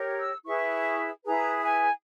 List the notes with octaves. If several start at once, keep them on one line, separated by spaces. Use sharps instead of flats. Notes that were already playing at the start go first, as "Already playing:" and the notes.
Already playing: G4 A#4 C#5
E6
E4 G#4 B4 C#6
E4 G#4 B4 A#5
G#5